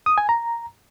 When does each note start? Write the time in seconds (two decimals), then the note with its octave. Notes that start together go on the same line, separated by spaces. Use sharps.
0.06 D#6
0.18 G#5
0.29 A#5